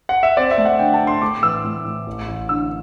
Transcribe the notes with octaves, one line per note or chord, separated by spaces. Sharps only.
F#5
E5
C4 D5
E5
A3
F#5
D3 G5
A5
D3
C6
A2 D6
E3 E6
A2
A2
A1
A1
D3 E6